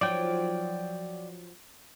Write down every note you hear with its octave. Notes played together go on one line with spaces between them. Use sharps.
F3 F#3 D#4 D5 G5